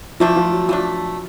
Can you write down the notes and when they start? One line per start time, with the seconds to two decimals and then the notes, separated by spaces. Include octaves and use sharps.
0.20 E3 F3 A3 D4
0.36 F3
0.52 F#3
0.69 E3 F3 A3 D4